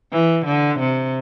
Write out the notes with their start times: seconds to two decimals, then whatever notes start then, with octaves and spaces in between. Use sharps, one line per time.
0.11 E3
0.46 D3
0.79 C3